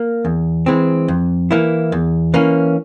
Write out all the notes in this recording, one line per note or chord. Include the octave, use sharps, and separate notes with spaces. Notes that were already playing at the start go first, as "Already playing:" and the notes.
Already playing: A#3
E2
E3 G#3 C4
F2
E3 A#3 E4
E2
E3 A#3 C#4